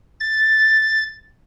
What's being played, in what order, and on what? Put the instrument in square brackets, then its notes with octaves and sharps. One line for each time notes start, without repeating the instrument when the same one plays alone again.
[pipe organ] A6